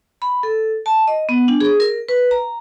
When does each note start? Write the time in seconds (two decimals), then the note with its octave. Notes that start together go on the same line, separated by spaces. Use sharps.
0.22 B5
0.43 A4
0.86 A5
1.08 D#5
1.29 B3
1.48 D4
1.60 G#4
1.80 A#4
2.09 B4
2.31 A#5